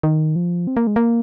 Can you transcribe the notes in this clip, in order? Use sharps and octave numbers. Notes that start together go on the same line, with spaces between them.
D#3
F3
C4
A#3
G#3
A#3